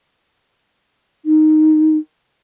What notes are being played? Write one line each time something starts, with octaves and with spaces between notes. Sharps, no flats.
D#4